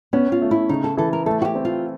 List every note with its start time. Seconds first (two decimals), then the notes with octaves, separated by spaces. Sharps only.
0.13 B3 C#4
0.32 F4
0.42 A3
0.51 E4
0.69 C#3 D#4
0.84 A4
0.97 E3 A4
1.13 A#4
1.26 A3 A4
1.42 F#4
1.45 G4
1.55 C4
1.65 F4